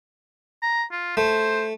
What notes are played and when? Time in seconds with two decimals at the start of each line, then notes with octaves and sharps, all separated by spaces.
0.62 A#5
0.92 F4
1.17 A3 C5